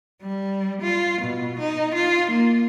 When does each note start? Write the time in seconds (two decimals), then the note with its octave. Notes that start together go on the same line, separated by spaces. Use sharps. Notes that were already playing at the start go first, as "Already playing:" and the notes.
0.22 G3
0.81 F4
1.21 B2
1.59 D#4
1.95 F4
2.31 A#3